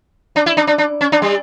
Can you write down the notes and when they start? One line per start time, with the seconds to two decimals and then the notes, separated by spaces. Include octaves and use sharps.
0.36 D4
0.46 E4
0.57 D4
0.67 D4
0.78 D4
1.01 C#4
1.12 D4
1.22 G3